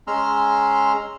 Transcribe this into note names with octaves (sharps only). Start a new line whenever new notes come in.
G#3 C#4 A#5 C6 E6 F6